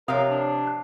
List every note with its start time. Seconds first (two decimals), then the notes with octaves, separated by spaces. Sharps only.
0.08 C3 F3 A#4 C5 C#5 F5 D#6
0.30 D4
0.67 F#6